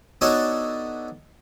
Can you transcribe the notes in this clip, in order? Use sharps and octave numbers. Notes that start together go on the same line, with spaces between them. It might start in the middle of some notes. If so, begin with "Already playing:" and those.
B3 D4 D#4 F#4 A4 C#5